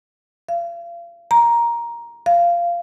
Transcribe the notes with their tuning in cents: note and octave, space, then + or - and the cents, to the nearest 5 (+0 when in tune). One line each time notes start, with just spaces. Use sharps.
F5 -35
A#5 +10
F5 -15